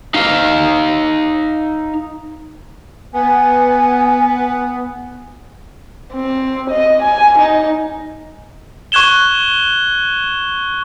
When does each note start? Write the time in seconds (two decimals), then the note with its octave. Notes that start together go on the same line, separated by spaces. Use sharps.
0.15 D#4 F5
3.14 B3 G#5
6.13 C4
6.70 D#5
7.03 G#5
7.39 D#4
8.92 C#6 F#6 G#6 E7 G7